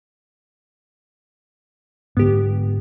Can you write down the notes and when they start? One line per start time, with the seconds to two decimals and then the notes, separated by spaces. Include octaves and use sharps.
2.17 G#2 D3 B3 G4